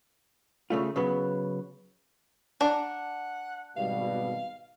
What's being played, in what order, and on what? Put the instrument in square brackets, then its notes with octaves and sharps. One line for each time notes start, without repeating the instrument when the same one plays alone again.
[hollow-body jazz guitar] C#3 A3 F4
C#3 F#3 B3
[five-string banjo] D4 A#5 [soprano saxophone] F#5
[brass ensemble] G#1 B2 G3 [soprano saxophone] F5